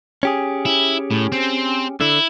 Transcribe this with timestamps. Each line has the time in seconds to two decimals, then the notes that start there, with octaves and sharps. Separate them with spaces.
0.23 C#4 G4 G#4
0.65 E4
1.11 A2
1.32 C4
2.01 D3 E4